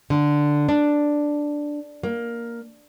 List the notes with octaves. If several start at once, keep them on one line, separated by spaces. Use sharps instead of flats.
D3
D4
A#3